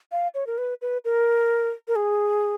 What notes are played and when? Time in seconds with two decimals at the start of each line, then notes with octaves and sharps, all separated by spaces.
0.12 F5
0.34 C#5
0.47 A#4
0.58 B4
0.82 B4
1.05 A#4
1.88 A#4
1.96 G#4